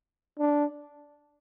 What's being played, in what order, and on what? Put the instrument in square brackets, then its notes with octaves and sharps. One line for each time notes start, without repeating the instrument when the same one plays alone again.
[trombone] D4